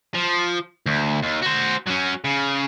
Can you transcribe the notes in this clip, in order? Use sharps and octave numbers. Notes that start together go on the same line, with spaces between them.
F3
D2
D#2
F#4 C5
F#3 C#4
C#3